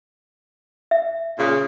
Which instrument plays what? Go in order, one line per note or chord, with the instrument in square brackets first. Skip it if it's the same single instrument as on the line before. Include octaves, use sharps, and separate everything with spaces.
[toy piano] E5
[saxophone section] A#2 C#3